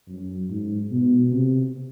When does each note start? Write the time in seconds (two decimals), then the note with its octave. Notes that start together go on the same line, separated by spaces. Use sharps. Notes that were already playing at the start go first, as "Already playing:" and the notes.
0.08 F#2
0.50 G#2
0.91 B2
1.32 C3